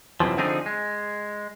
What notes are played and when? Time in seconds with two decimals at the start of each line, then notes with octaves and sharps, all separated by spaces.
0.20 F#2 C3 E3 F3
0.37 D3 F3 C4 D4 D#4 G#4
0.66 G#3